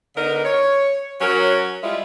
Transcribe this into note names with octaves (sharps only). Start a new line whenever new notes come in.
D3 B3 D#4 A#4
C#5
F#3 C#4 F#4 A#4
G3 G#3 E4 F4